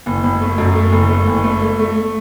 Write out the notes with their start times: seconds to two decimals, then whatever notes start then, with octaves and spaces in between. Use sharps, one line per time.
0.06 F#1
0.23 F#1
0.41 A3
0.58 F#2
0.75 A3
0.92 F#1
1.10 A3
1.27 F#1
1.44 A3
1.62 A3
1.79 A3